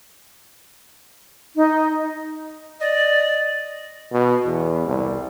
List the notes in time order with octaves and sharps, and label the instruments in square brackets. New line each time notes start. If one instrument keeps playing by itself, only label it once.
[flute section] D#4
[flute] D5 [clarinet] D#5
[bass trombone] B2
E2
C2